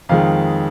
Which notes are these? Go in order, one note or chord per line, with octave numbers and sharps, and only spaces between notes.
F2 D#3 G#3 F5